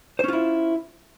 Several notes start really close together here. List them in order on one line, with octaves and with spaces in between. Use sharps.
C5 C#4 F4 E4